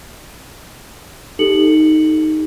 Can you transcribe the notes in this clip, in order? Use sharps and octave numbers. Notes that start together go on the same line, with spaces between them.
D#4 G4 A4 C#7 F#7